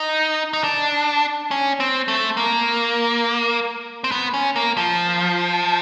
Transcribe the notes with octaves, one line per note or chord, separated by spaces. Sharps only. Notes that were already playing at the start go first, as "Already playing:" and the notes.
Already playing: D#4
D#4
D4
C#4
C4
A3
A#3
C4
B3
C#4
A#3
F3